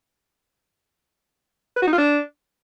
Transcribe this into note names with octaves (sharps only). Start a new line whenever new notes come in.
B4
F#4
D#4
F4
D4